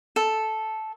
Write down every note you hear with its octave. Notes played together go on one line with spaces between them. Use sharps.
A4